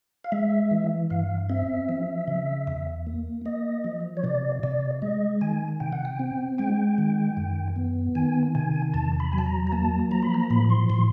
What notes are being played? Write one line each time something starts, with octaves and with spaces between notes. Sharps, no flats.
F5
G#3 E5
E3
G2 F5
C4 E5
F3
C#3
E2
A#3
A#3 D#5
F3
C#5
C3 D5
C3 D5
G#3 D#5
D#3 G#5
C3 G5
F#5
G5
C4
G#3 G5
D#3
F#2
B3
D#3 G#5
C3 G#5
E2 A5
B5
F#3 G#5
A5
A#5
A#5
A#3 A5
F3 A#5
B5
A#5
A2 B5
C6
A2 C6